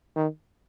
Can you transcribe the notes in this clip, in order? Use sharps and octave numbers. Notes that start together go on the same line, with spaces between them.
D#3